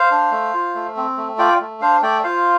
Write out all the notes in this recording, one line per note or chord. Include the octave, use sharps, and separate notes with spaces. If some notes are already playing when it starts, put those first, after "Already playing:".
Already playing: C5 F5
D4
A3
F4
A3
C4
A3
F4 D5 G5
A3
D4 C5 F5
A3 D5 G5
F4 C5 F5